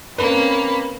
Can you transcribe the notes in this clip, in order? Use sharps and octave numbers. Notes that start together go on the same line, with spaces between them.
A#3 C4 C#4 B4 B5